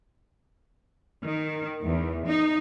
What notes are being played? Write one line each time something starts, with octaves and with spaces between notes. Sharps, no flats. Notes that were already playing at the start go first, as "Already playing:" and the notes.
D#3
E2
D#4